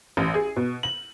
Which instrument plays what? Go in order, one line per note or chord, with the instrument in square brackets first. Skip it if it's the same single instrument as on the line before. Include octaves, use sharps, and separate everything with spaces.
[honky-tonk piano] A1
G#4
B2
F#7